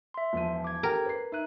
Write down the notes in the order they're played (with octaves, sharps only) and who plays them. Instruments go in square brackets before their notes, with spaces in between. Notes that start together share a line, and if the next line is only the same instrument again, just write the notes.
[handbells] E5 C6
[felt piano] E1 F3 D#7
[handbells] D6 G#6
[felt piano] G4 A4 G5 [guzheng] A#4
[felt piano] B4 C7
[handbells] D#4 F#6 [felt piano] E5 D#7